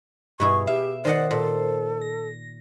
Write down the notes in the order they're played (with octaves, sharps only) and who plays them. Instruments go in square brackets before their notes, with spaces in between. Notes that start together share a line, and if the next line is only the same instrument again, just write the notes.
[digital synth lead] G2 [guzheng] B2 E4 G#4 [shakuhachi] C#6
[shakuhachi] G4 [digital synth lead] E5 [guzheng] F5
[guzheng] D#3 D#5 F#5 [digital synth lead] C5 [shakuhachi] D5
[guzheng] A#2 [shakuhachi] A4
[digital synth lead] A#6